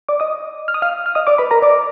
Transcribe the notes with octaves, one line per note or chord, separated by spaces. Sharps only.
D5 D6
D#5 D#6
F6
D#6
F5 F6
F6
D#5 D#6
D5 D6
B4 B5
A#4 A#5
D5 D6